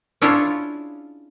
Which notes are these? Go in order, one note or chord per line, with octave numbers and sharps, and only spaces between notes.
C#4 D4 E4 F4 G#4 C#5